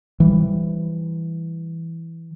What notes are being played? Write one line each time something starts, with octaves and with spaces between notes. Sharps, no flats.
E3 G3